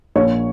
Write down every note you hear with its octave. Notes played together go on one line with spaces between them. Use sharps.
A#1 C#5